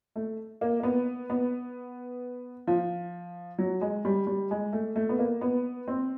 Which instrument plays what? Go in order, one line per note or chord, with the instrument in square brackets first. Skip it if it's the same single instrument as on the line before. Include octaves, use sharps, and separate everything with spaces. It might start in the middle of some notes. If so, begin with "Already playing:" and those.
[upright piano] A3
A#3
A#3
B3
B3
F3
F#3
G#3
G3
G3
G#3
A3
A3
B3
A#3
B3
C4